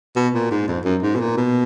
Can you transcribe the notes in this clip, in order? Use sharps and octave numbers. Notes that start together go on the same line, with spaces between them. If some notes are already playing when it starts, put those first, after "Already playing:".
B2
A#2
G#2
F2
F#2
G#2
B2
A#2
B2